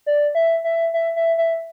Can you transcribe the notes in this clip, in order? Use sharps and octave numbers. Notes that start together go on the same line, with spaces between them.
D5
E5
E5
E5
E5
E5